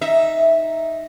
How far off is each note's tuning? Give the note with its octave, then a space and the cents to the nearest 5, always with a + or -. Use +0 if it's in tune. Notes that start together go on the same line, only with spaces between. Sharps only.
D#4 +0 E5 -5